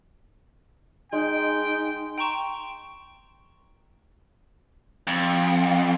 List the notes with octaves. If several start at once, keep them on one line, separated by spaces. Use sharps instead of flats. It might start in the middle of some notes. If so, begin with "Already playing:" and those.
G#3 D#4 G5
G5 A#5 C6 C#6 E7
F2